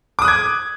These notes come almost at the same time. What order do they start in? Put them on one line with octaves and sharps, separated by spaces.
D6 D#6 F#6 G#6